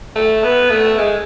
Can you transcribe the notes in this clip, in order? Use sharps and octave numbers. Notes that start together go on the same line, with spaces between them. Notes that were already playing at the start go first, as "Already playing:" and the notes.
A3
B3
A3
G#3